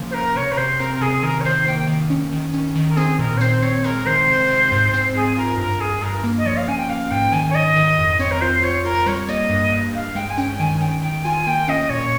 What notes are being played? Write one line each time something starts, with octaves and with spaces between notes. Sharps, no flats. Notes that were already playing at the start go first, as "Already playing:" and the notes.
Already playing: C#3 F3 A#3
C5
C#3 A#4
C3 C#5
A#4
C3 C5
C4 A#4
A#4
C3 G#4
D#3 A#4
C#5
D#3 C5
A#3 G5
D#3
C#4
D#3
C#4
D#3
A#4
C4 G#4
A#2 A#4
C#5
C4 C5
C4 C#5
G#3 A#4
D#3 C5
C3
C3
G#2
C4
G#2 G#4
F4 A#4
G2 A#4
G2 G#4
G2 A#4
A#3
D#5
F3 C#5
F5
C#4 G#5
G5
A#3 F5
G#2 G5
D#3 G#5
C#5
D#3 D#5
D#3
F2
C4 C#5
A#4
F4 C5
F4 C#5
F4 A#4
G3 C#5
A#3 D#5
G2
G2
G2 F5
G#3 G5
G#5
C#4 G5
D#3 G#5
D#3 G5
D#3 G5
F4 G#5
A#3 G5
C#4 D#5
A#2 C#5